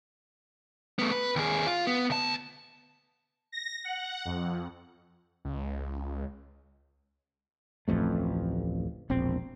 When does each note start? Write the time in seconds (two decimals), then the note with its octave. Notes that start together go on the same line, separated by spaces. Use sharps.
0.99 A3 B3
1.12 B4
1.36 D#2 G#4
1.66 F4
1.87 B3
2.10 D2 A5
3.52 A#6
3.84 F#5
4.25 F2
5.45 C#2
7.88 D1 A1 F2 A3
9.10 E1 A#1 C4